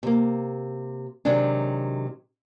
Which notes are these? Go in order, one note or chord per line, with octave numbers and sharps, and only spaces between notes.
C3 A#3
C3 D#3 F#3 G#3 D4